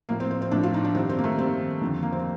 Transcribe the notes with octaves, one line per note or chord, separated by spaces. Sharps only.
A2 F3 A#3
C4
C4
C4
A2 F3 D4
F4
D#4
D4
G2 D#3 C4
C4
A#3
A3
G2 D#3 C4
F2 D3 F3
A#3
C4